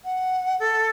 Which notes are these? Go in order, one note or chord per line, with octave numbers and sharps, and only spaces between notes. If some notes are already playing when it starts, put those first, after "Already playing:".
F#5
A4